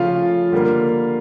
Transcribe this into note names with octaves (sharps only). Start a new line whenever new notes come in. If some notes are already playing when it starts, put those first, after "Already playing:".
Already playing: C#3 F3 A3 F4 F5
D3 G3 A#3